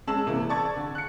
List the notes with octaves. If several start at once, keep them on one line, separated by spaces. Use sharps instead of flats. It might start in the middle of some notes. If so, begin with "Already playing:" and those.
G#3 C#4 A5 E6 E7 F#7
C3 E3 A#3
D5 A5 C#6 G#6 A6
D3
F#6 C#7